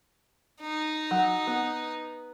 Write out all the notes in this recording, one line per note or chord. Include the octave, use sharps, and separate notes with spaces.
D#4
F#3
B3